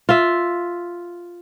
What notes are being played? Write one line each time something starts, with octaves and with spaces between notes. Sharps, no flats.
F4 E5